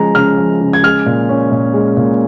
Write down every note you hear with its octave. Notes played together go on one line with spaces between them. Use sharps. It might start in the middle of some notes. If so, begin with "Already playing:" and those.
Already playing: C#3 F3 G#3 A#5
C#3 F6
F3
C#3
G#6
G#3 F6
A#2
C#4
A#2
G#3
A#2